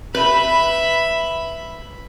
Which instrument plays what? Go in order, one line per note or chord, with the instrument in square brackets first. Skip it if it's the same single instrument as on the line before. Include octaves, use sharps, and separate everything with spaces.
[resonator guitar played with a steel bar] B4 [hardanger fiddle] E5 B5